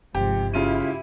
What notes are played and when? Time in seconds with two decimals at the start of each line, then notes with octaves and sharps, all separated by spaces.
0.15 G1 G#2 C3 F3 G4
0.54 C#3 E4 F4 G4 D#7